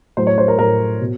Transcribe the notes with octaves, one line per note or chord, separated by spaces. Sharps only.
A2 F#3 C5
C#5
C5
A#4
A2 F#3 A#4
B2